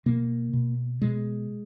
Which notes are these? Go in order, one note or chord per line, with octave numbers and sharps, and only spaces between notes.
B2 A#3
B2
B2 G#3